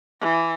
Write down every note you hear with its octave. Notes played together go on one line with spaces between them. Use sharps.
E3